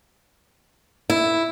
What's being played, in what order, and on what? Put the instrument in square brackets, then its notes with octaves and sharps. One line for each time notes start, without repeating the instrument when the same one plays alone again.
[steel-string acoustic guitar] E4